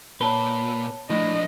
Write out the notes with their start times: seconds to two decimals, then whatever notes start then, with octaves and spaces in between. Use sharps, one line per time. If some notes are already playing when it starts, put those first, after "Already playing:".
0.21 A#2 B4 C#5 A5 G7
1.10 A2 F3 D4 D#5